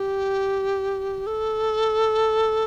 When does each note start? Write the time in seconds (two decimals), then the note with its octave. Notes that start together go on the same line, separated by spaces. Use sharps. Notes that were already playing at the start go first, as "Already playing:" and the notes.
Already playing: G4
1.27 A4